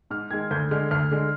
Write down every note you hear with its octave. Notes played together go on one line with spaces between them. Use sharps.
G#2 F6
D#3 G#3 G#6
D2 G6
D3 G#3 F6
D2 F6
D3 G#3